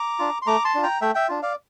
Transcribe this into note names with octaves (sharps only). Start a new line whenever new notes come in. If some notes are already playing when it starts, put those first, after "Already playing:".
Already playing: A#5 D6
D4 F4
C6
A3 A#5 D6
A5 C6
D4 F4
G5 A#5
A3 E5 G5
E5 G5
D4 F4
D5 F5